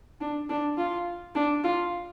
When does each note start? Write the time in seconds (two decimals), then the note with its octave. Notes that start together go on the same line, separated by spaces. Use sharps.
0.21 D4
0.49 D4
0.77 F4
1.35 D4
1.64 F4